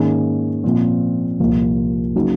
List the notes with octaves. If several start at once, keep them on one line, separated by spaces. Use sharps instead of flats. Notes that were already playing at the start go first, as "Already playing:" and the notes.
Already playing: G#2 D#3 A#3 C#4 G#4
A#2 F3 C4
C2 A#2 F3 A#3
C#3 F#3 A#3 D#4